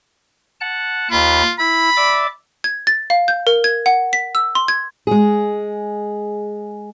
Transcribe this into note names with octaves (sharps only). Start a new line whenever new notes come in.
F#5 A5 F#6
D#2 F4 B5
E4 B5
D5 E5 D6
G#6
A6
F5
G6
A#4
G#6
F#5
B6
E6
C6
G#6
G#3 G#4